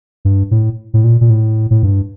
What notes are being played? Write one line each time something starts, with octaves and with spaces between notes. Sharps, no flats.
G2
A2
A2
A#2
A#2
A2
A2
G2